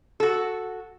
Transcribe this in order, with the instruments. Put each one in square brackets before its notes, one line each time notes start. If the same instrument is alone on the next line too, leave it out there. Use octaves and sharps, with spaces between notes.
[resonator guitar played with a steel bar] F#4 A4